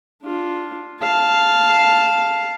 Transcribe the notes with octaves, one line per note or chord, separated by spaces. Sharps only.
D4 F4
F5 A5